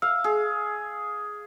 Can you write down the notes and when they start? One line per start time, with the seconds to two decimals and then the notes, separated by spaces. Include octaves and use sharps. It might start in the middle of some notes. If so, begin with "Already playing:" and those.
0.02 F5 E6
0.24 G#4